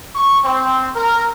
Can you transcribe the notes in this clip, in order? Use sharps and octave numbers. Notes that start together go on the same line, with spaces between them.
C#6
C4
A#4